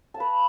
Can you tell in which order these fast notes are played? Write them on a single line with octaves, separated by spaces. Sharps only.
A5 F5 B4